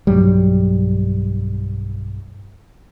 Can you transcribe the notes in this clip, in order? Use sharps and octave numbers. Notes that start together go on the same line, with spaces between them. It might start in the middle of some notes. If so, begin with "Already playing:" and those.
B1 G2 F#3 G3